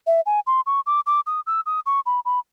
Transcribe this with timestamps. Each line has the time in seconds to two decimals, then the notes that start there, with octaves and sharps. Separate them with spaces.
0.07 E5
0.26 G#5
0.47 C6
0.66 C#6
0.86 D6
1.06 D6
1.26 D#6
1.47 E6
1.66 D#6
1.86 C#6
2.06 B5
2.25 B5